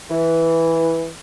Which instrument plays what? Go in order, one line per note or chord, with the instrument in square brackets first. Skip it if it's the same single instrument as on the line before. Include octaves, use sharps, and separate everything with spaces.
[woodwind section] E3